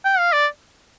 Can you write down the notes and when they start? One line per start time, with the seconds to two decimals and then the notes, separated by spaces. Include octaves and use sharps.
0.05 G5
0.18 F5
0.33 D5